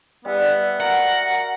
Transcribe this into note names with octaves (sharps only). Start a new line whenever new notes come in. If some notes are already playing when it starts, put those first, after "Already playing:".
G3 B3 E5
F#4 A#4 F#5